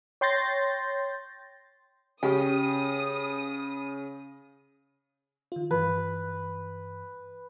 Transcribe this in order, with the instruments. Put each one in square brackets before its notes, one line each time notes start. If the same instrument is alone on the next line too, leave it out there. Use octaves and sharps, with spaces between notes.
[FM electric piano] C#5 G5 C6 G6 A6 A#6
[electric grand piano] C#3 [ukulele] C#4 G4 G5 [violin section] D#6
[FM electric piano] D#3 F4
[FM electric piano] G2 E3 [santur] B4